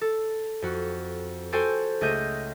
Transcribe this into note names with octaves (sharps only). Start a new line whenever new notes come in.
A4
F2 F#4
F#4 A4 C5 G5 G#5
C#2 A3 G#4 D#5 G6 D#7